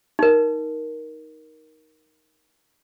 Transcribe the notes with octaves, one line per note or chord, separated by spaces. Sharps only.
D#4 A#4